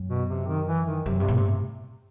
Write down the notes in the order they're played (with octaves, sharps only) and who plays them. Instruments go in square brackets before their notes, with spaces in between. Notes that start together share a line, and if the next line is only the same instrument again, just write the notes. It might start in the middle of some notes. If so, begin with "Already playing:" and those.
Already playing: [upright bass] F#2
[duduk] B2
C3
D#3
E3
D#3
[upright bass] F#2 [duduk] C3
[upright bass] G2 [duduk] C3
[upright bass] B2
[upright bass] A2 [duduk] C3